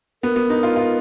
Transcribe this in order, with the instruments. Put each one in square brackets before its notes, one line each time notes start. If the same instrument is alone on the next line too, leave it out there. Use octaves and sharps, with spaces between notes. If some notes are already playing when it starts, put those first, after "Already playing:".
[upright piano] B3 [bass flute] A#4
[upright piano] B3
D#4
F4
F4